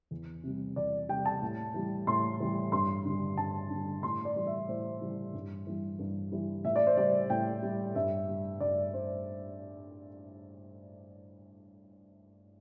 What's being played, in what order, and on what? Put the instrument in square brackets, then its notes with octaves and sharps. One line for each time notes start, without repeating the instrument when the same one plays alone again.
[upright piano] E2
C3 G3
E2 D5
C3 G3 G5
A5
A2
E3 G3
A2 C6
E3 G3
G2 C6
D3 G3
G2 A5
D3 G3
A2 C6
D5
E3 G3
E5
A2 C5
E3 G3
G2
E3 G3
G2
E3 G3
A2 E5
D5
C5
G3 D5
A2 G5
G3
G2 E5
G3
G2 D5
G3 C5